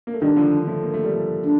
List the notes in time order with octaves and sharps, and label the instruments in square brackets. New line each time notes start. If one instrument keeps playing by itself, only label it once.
[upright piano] A#3
A3
[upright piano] D#3 G3 [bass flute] D4
[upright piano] D3 F3
F3 A3
A#3
A3
G3
F3 A3
[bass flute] D4